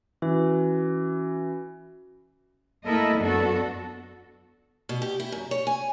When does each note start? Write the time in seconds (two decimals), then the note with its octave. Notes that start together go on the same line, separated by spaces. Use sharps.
0.22 E3 C#4 F#4
2.85 A3 A#3 E4 A4 A#4 D#5
3.18 F#2 F#3 B3 D4 F#4 A4
4.89 B2
5.02 G4
5.20 E4
5.32 F#2
5.51 C#5
5.67 G#5